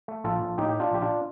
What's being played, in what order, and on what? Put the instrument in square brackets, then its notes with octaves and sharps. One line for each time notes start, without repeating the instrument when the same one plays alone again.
[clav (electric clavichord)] A3
A#1 F4 A4
A#1
A2 D#4 G4
G4
A3
D4 F4
A#1 G4
D4 F4